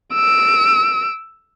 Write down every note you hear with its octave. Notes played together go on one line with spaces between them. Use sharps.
E6 D7